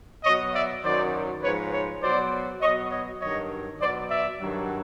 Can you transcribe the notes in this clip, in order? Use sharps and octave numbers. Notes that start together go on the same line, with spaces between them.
B2 F#3 C#5 D#5
D5 E5
F#2 D#3 F#3 C5 D5
G#2 F3 B4 C#5
B4 C#5
B2 F#3 C5 D5
B2 F#3 C#5 D#5
C#5 D#5
G2 D#3 F#3 C#5 D#5
B2 F#3 C5 D5
D5 E5
G2 D#3 F#3